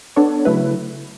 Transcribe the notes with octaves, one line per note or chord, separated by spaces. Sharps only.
B3 D4 A4 C#5
C#3 F#3 A3 E4 B4